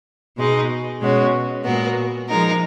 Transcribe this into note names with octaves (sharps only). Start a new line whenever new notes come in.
B2 G#3 D#4
B2 G#3 C#4 F#4
A#2 G#3 B3 F#4 A#4
F3 G#3 D#4 A#4